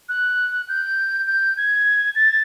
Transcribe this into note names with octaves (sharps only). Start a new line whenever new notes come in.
F#6
G6
G6
G#6
A6